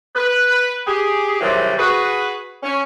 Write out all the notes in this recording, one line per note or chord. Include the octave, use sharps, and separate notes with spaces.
B4
G4 G#4
G#2 C3 D#3 E3 F#3 G3
F#4 G#4 B4
C#4